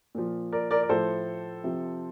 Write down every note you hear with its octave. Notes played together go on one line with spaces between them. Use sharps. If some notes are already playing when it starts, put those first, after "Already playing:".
A#2 F3
A#4 D5
A#4 D5
D5
A2 F3 A4 C5
C3 F3